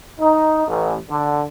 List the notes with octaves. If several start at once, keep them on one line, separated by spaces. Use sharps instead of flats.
D#4
A1
D3